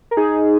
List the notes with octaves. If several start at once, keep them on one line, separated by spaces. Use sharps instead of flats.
A#4
D#4 G#4